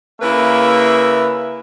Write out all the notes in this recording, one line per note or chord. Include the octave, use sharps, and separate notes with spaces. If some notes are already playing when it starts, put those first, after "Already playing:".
C#3 A#3 E4 B4 E5